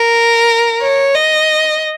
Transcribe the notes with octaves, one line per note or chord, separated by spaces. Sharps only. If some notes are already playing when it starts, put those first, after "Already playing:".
Already playing: A#4
C#5
D#5